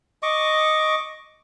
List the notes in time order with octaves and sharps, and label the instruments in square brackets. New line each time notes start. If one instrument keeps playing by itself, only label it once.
[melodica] D#5 C#6 D6